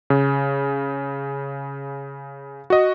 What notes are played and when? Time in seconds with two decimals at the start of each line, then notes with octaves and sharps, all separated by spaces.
0.10 C#3
2.70 F#4 D#5